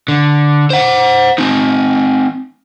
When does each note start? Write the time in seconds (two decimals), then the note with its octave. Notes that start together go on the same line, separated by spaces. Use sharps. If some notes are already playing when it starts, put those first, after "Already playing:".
0.08 D3
0.70 C5 F#5
1.38 C4 D#4